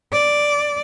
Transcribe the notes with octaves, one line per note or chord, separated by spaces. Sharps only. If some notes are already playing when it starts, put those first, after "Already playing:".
D5